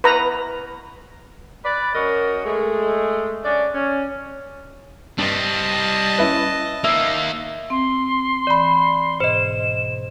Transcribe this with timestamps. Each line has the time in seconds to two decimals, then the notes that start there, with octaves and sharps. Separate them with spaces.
0.04 B4 A#5
1.65 B4 D5
1.95 F#2 F#4 A#4 D#5
2.45 G#3 A3
3.44 C#4 D4 D5
3.74 C#4
5.18 G2 G3 C4 D#5 A5
6.18 C#4 E4 B4
6.84 A#3 D#4 E5
7.70 C4 C6
8.47 E3 D5 B5
9.20 G#2 B2 C5 D#5 E7